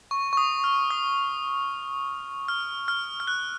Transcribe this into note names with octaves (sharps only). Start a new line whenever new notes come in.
C#6
C#6
D#6
F6
D#6
F6
F6
F6
F#6